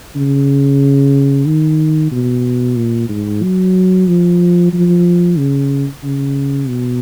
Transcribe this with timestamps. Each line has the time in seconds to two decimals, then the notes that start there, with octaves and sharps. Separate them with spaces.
0.16 C#3
1.46 D#3
2.12 B2
2.76 A#2
3.09 G#2
3.43 F#3
4.08 F3
4.73 F3
5.38 C#3
6.04 C#3
6.68 B2